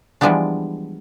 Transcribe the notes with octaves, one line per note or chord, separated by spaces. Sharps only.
E3 F3 G3 G#3 B3 D4